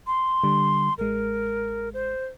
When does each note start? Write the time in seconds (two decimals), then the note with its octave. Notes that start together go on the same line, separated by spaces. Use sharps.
0.07 C6
0.44 D3 G3
0.98 A1 G#3 A#4
1.94 C5